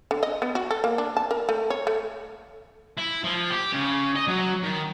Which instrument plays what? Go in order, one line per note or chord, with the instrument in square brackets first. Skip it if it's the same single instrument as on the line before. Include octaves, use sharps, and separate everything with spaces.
[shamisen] D3
D#5
B3
F#4
A4
A#3
D4
A5
A#4
A3
C#5
A3
[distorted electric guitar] E4
F3
G4
C#3
D#5
F#3
D#3